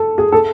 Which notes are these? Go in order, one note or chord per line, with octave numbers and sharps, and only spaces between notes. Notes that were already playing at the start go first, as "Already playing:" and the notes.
Already playing: A4
G#4
A4